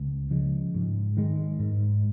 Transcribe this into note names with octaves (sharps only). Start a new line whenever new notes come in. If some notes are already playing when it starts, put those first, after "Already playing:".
Already playing: C#2
C#3 F3 G#3
G#2
D#3 G#3
G#2